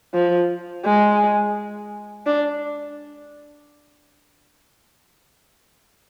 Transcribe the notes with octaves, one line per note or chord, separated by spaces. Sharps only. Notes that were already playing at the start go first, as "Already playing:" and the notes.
F3
G#3
D4